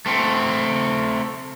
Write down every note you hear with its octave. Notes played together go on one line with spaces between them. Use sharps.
A3 C4